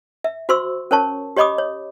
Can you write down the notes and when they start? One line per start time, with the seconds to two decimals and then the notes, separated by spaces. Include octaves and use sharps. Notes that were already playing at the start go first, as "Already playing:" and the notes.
0.24 E5
0.49 F#4 C5 C6 C#6 E6
0.91 C#4 A#4 C#5 A5 C#6
1.36 G4 C#5 D#5 B5 D6 D#6
1.58 C#5